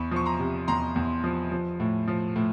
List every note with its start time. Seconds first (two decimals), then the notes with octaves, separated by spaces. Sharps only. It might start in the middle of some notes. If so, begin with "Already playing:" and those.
Already playing: E2 B5 C#6
0.11 F3 C#6
0.26 A#5 C6
0.39 C3
0.68 E2 A#5 C6
0.96 E2
1.24 F3
1.52 F3
1.80 A2
2.08 F3
2.36 A2